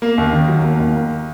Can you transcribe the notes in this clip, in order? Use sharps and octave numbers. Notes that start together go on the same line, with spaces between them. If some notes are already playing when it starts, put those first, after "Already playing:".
A#3
D#2
D#3
F#3
A#3
D#2
A#3